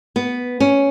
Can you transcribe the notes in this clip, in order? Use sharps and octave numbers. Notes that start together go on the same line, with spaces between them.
B3
C#4